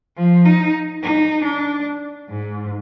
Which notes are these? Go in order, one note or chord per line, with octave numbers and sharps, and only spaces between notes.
F3
D#4
D#4
D4
G#2